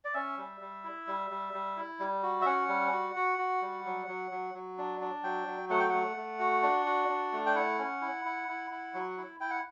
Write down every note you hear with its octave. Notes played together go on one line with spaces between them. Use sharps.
D5
C#4 E5
G3
G3
E4
G3
G3
G3
E4
G3
F#4
E5
C#4 F#5
G3
F#4
F#4
F#4
G3
F#3
F#3
F#3
F#3
D4
D4
F#3 G5
F#3
A3 F#5
G5
A3 F#5
A3
F#4
D4
F#4
D4
A3
G5
E4 F#5
C#4
E4
E4
E4
E4
F#3
E4
E4 G5
F#5